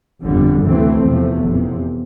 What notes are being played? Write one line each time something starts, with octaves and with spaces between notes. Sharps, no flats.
G1 F2 D3 G3
D2 C3 E3 A3 C4
E2 C3 F3 A3
F1 E2 C3